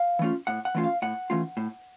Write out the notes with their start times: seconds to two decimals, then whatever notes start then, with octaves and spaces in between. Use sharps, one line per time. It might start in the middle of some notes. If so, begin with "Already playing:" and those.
Already playing: F5
0.19 E3 A3 C#4 F4
0.47 A2 F#5
0.65 F#5
0.75 E3 A3 C#4 F4
0.84 F5
1.02 A2 F#5
1.30 E3 A3 C#4 F4
1.57 A2